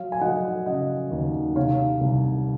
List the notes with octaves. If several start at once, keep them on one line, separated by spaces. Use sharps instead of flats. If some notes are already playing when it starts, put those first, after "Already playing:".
Already playing: F#3 C#5 F5
G#5
F#3 D#5 F#5
C#3 D#5 F#5
D#2
C3 C#5 F5
C2